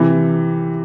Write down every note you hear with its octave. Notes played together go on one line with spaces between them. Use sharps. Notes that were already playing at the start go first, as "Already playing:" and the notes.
Already playing: C3 E3